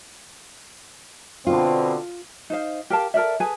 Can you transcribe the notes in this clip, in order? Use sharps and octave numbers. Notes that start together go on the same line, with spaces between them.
B2 D3 C4 F4
D#4 C5 F5
G4 A#4 F5 A5
A4 A#4 D5 E5
G#4 A4 B4 G#5